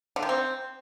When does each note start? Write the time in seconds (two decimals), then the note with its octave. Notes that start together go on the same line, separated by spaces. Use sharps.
0.16 D3
0.23 D#3
0.29 C4